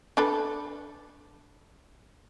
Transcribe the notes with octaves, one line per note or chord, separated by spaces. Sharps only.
D4 A4 B4